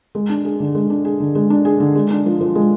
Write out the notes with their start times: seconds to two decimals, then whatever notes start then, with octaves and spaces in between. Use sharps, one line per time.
0.15 G#3
0.30 D4
0.45 G#4
0.60 D3
0.75 G#3
0.90 D4
1.05 G#4
1.20 D3
1.35 G#3
1.50 D4
1.65 G#4
1.80 D3
1.95 G#3
2.11 D4
2.26 F3
2.41 F3
2.55 G#3